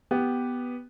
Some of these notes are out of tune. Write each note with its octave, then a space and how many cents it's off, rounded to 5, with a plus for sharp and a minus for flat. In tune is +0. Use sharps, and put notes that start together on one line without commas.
B3 +0 G4 +0